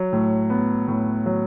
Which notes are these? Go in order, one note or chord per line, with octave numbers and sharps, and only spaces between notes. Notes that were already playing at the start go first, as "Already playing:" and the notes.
Already playing: F#3
A2
B3
A2
F#3